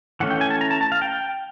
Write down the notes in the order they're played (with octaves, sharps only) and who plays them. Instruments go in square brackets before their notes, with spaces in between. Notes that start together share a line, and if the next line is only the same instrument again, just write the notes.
[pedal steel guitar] E3 A3 C#4 F#5
G5
G#5
A5
A#5
A5
A5
F5
G5